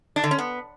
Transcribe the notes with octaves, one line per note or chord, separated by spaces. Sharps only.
D4
D3
C#4
B3